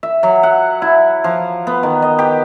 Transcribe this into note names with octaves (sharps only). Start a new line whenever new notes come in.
E5
F#3
F#5
E4
F3
B3
D#3
D#5
G4